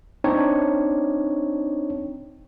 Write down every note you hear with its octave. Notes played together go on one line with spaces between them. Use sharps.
C4 D4 D#4 C#5